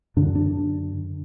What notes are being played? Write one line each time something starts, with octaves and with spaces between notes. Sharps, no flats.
F#2 D3 D4
D4